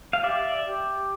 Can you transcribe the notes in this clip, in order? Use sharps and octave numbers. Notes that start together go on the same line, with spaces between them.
F5
G4 D5 E5
G4